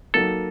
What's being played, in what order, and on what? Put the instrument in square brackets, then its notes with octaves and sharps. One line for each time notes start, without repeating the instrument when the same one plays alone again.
[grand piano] F#3 A#3 D#4 [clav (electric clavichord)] A4